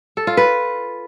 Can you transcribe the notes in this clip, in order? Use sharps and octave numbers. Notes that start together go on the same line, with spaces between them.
A4
F4
B4